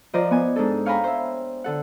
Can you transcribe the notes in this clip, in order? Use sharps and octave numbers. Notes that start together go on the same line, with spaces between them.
F3 A#4 C5 D5 D#5
B3 G#5
G#2 D4 A4
C#5 F5 G5 G#5 A#5 B5
C5 E5
D3 A4 F#5